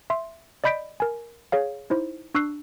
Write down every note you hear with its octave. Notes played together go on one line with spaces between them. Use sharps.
E5 C6
D5 D#5 B5 G6 B6 D7
A#4 G#5
G#4 C#5 F5
D#4 E4 C5
D4 C#6 E6 F#6 C7